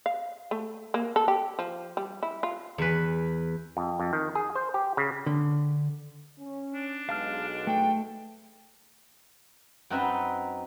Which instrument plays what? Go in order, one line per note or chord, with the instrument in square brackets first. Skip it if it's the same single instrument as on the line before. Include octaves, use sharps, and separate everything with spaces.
[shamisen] F5
A3
A#3
A4
G4
F3
G3
E4
F4
[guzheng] E2 B4
[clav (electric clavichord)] F2
F2
D#3
G#4
C5
G4
C#3
[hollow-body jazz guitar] D3
[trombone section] C#4
[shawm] D4
[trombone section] B1 B2 G#3 [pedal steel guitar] F5 A5 F6
[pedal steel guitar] A3 [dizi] G5
[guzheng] F#2 C4 D#4 B4 E5